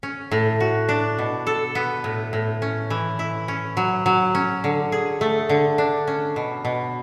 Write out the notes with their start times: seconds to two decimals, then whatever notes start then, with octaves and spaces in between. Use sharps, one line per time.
0.03 C#4
0.32 A2
0.60 F#4
0.89 D4
1.18 B2
1.47 A4
1.75 B3
2.04 A2
2.33 A2
2.62 C#4
2.90 E3
3.19 E4
3.48 C#4
3.77 F#3
4.06 F#3
4.35 C#4
4.64 D3
4.92 G#4
5.21 A3
5.49 D3
5.78 D4
6.07 C#4
6.36 B2
6.65 B2